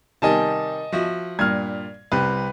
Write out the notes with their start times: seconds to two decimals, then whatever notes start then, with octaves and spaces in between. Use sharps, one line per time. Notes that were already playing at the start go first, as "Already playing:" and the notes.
0.22 C3 D#3 G3 D#5 G#5 A5
0.92 F3 F#4 E5
1.39 G2 A#2 F6 G#6
2.12 C2 C3 B4